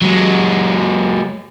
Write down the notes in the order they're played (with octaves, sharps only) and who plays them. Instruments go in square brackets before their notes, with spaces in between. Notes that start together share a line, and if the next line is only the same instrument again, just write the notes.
[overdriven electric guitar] F#3 G#3